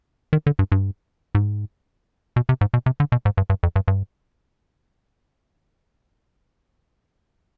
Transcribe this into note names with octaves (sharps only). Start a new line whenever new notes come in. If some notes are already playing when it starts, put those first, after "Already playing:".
D#3
D3
G2
G2
G#2
B2
C3
G#2
B2
C3
D3
B2
G#2
G2
G2
F2
G2
G2